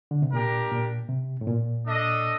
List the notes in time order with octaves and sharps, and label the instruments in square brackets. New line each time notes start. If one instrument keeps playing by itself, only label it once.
[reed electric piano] D3
C3
[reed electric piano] A#2 [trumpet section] D4 G4 A#4
[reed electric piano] A#2
C3
A2
A#2
[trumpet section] D4 A4 D#5